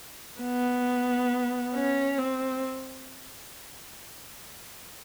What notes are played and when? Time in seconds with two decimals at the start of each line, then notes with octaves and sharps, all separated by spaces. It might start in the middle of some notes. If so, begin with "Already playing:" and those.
0.41 B3
1.74 C#4
2.18 C4